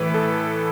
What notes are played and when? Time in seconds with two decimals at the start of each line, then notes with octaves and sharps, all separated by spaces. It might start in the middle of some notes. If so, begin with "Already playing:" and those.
Already playing: A2 E3 B4
0.14 A4